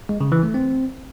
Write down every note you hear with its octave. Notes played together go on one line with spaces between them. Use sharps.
G#3
C#3
E3
A3
C4